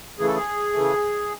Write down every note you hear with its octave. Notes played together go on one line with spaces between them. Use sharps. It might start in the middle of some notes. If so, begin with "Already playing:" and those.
C#3 E3 A3 G#4
A4
G#4
C#3 E3 A3